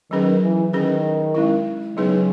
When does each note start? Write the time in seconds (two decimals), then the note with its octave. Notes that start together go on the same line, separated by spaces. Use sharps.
0.11 D#3 F#3 C#4 G#4 B4
0.42 E3
0.73 D#3 C#4 G#4 B4
1.34 G#3 C#4 E4
1.96 C#3 F#3 B3 D#4 G#4 B4